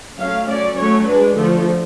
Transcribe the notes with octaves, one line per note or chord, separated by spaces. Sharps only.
F#3 A3 C#4 F5
F#3 C#4 D5
F#3 A3 C#4 C#5
G#3 D4 B4
D3 F3 A3 A4